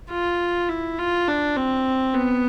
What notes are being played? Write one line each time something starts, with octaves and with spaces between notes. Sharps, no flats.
F4
E4
F4
D4
C4
B3